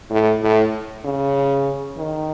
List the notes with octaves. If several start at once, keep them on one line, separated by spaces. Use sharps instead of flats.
A2
A2
C#3
D#3